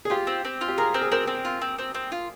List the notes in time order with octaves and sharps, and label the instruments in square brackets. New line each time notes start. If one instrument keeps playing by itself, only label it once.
[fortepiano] G#4
[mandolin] F4 [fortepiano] G4
[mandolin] C4
C4
F4
[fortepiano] G4
[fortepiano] G#4 [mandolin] A#4
[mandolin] C4
[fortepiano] G#4
[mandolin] C4 [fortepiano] A#4
[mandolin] C4
F4
C4
C4
C4
F4